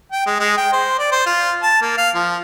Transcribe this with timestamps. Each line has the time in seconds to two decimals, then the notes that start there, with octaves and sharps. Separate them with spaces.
0.12 G5
0.26 G#3
0.40 G#3
0.58 G5
0.72 C5
0.99 D5
1.12 C5
1.26 F4
1.63 A5
1.82 A#3
1.97 F5
2.15 F3